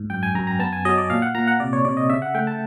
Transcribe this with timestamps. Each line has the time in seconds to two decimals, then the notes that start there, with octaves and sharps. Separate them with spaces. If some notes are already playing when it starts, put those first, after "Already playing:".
Already playing: G#2
0.10 F#2 G5
0.23 G#5
0.35 F#2 A#5
0.47 A#5
0.59 B3 A5
0.73 G#5
0.85 F#3 D#5
0.98 D5
1.10 A#2 F5
1.22 F#5
1.35 A#2 A#5
1.47 F#5
1.60 C3 D5
1.73 C#5
1.85 C3 D5
1.97 D#5
2.10 C#3 E5
2.22 F#5
2.35 A3 G5
2.47 A5